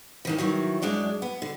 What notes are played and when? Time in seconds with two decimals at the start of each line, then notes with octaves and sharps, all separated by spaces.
0.25 G2 D#3 E3
0.38 D#3 E3 F#3
0.82 F#2 G#3 D4 D5
1.22 B3
1.42 D3